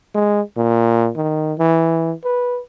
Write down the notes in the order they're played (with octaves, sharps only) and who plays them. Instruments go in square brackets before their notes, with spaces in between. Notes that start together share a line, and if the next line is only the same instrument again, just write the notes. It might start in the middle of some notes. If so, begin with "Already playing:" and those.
[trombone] G#3
A#2
D#3
E3
B4